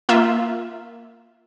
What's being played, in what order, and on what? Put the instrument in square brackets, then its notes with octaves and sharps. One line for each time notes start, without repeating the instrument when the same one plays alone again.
[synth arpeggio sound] A#3 F4 E5